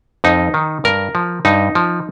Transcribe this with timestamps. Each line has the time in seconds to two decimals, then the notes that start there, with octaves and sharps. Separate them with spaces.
0.24 F2 D#4
0.54 D#3
0.84 G2 A#4
1.15 F3
1.45 G2 D#4
1.75 F3